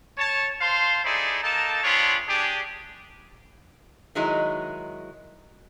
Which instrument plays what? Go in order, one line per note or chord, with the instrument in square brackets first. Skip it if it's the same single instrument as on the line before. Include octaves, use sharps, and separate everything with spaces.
[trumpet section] C#5 A5
C5 F5 A5 C6
D#4 E4 G#4 A4 C5 D5
A#3 D#4 A4 A5
C4 D4 F4 G#4 C#5 B5
D4 G4 G#4
[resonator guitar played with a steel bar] D#3 F#3 G#3 D#4 E4